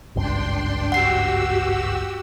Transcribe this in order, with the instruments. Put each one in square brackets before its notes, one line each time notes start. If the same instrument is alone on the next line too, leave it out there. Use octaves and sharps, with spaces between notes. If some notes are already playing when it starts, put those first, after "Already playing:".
[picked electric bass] G#1 C#2 G2 [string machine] D4 G5 C6
[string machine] F#4 G4 E6 [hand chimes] F#5 C7